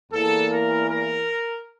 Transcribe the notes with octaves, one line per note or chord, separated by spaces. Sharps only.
E2 E3 A#3 A4
A#4
A#4